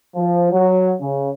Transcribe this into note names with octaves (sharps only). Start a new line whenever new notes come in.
F3
F#3
C#3